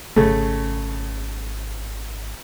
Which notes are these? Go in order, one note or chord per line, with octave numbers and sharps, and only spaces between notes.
G#1 C#3 A3